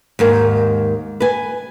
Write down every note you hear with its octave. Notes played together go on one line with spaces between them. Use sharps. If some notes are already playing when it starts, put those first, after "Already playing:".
D#2 G#2 A#4
B4 G#5